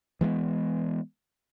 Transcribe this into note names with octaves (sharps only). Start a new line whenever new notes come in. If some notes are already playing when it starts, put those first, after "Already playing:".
E3 G#3 A3 B3